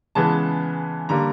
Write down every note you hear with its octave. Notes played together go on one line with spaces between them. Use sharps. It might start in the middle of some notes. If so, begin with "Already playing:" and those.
C#3 E3 G#3 B3 A5
D3 G3 A#3 A#5